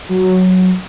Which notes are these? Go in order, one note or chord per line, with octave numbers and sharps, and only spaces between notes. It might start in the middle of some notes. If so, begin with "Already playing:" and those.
F#3